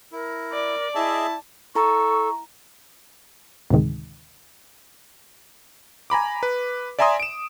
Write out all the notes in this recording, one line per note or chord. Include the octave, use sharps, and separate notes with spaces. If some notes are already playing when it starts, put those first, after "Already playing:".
E4 A#4
D5
E4 G#4 D#5 E5 A5
E4 A4 A#5 C#6
D2 A2 C3 D#3 G#3
G#5 A#5 B5 D6
B4
D5 E5 G#5 A#5 C6 D#6
D7 E7